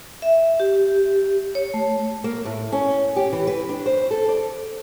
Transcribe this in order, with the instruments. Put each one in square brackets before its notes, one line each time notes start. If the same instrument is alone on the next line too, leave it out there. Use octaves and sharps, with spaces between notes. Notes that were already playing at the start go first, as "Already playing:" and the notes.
[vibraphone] E5
G4
C#5
A3
[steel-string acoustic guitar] A#3
A2
C#4
G4
E3
B4
D4
C5
A4
D5